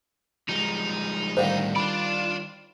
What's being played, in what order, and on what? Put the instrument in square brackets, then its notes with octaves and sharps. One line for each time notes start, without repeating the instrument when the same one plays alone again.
[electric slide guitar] F3 G3 G#3 [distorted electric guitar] D#4
[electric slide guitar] A2 D3 [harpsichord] D#3 G3 [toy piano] C5 F5 F#5
[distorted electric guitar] D4 D5 [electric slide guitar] F4 [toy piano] B5